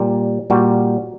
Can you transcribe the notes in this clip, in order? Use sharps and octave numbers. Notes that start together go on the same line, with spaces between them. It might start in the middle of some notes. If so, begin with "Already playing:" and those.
Already playing: A#2 G3
A#2 G3 F#4